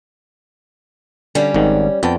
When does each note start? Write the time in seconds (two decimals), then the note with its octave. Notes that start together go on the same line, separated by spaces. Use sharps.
1.35 D3 G3 C#4
1.54 G#1 G#2 D#3
2.03 F2 B3 G5 A5